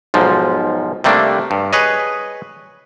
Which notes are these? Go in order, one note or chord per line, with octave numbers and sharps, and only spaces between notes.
B1 G#2 F3
C3 G3 A3 A#3 D4
G2
G#4 B4 C#5 D#5